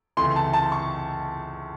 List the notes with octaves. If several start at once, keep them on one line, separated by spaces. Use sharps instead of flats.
C#2 C3 E3 A3 C6
A5
A5
C#6